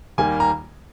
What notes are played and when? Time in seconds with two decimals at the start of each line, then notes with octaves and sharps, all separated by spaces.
0.18 D#2 D#3 G3 A#3 G#5
0.40 A#5